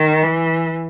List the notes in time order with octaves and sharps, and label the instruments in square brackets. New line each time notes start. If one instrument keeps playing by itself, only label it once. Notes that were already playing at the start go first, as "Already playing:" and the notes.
Already playing: [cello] D#3
E3